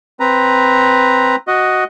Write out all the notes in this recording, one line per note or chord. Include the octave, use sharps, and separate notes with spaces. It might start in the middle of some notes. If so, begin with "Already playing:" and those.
C4 B4 A#5
F#4 D#5